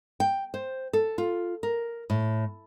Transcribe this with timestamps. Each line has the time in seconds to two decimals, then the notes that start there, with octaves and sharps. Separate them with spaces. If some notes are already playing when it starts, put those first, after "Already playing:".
0.20 G5
0.54 C5
0.93 A4
1.18 F4
1.63 A#4
2.10 A2